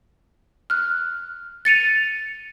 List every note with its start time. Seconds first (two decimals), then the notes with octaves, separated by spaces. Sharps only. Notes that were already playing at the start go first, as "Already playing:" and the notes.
0.70 F6 F#6
1.65 A6 C#7 D#7 F7